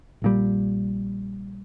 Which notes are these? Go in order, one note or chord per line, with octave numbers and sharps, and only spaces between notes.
A#1 A#2 G3